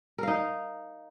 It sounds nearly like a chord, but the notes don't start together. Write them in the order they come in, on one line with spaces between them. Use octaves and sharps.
A#4 F5 D#4